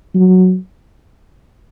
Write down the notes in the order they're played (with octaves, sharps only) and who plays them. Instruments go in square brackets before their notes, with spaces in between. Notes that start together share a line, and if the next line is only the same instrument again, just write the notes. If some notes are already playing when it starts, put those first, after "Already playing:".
[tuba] F#3